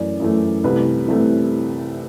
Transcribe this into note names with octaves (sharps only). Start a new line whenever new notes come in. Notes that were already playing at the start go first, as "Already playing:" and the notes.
Already playing: F#2 E3 A3 D5
F#2 E3 A3
C2 C3 E3 A3 B4
C2 C3 E3 A3